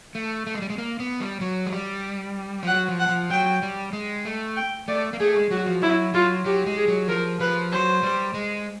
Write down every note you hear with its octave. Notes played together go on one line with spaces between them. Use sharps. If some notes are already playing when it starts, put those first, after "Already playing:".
A3
A3
G#3
G3
G#3
A#3
B3
G3
F#3
G#3
G3
F3
F#3 F#5
F3
F#5
F3
F#3 G5
G3
G#3
A3
G5
A3 D5
A#3
A3 G#4
G#3
F#3 F#4
F3
F#3 E4
F#3 F4
F#3 G4
G#3
G#4
F#3
F3 A#4
F3 B4
F#3 C5
G3
G#3